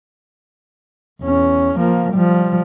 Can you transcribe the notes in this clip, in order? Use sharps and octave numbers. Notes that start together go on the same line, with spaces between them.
E2 C#4
F3 A#3
F3 G3